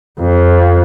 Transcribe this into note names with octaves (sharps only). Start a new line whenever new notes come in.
F2